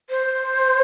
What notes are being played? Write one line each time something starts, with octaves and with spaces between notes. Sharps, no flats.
C5